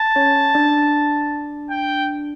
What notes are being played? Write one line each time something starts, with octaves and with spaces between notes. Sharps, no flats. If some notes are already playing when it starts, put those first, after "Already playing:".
Already playing: A5
C#4 C#5
D4 D5
G5